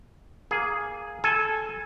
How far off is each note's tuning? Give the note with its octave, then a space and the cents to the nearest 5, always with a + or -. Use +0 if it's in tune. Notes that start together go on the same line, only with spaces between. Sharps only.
A#3 +0 G#4 +0
A4 -15 G#5 +0